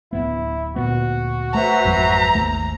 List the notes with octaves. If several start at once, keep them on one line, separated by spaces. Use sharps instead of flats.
D1 G1 B3 E4
D2 A#2 B3 F#4
A3 B4 C5 E5 A#5
G#1 F2 F#3
G#1 D#2 A3